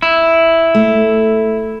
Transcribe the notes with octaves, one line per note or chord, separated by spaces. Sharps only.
E4
A3